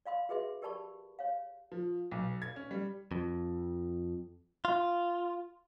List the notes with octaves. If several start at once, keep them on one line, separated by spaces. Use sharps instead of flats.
D5 F5 B5 C6
F#4 G#4 B4 E5 C6
G4 A#4 D5 A5 B5 C#6
C#5 F5
F3
B1
G#6
C#4
G3
F2
F4